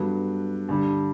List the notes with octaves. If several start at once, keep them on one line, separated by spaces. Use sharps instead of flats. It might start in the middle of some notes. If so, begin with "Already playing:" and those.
Already playing: G2 F#3 B3 A4
G2 D3 G3